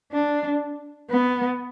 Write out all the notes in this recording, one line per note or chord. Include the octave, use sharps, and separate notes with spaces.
D4
B3